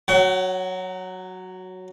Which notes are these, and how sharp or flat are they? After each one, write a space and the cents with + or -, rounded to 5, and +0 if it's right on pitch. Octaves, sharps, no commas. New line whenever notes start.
F#3 +0 F#5 +40